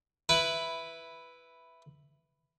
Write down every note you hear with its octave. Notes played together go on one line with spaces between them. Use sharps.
E4 B4